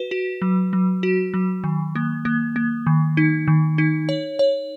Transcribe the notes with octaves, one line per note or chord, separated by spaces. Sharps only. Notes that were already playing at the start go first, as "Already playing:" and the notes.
Already playing: F#4 B4
F#4
F#3
F#3
F#4
F#3
D#3
A#3
A#3
A#3
D#3
D#4
D#3
D#4
C#5
C#5